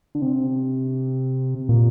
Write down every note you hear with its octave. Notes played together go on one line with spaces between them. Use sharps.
D3
C3
A#2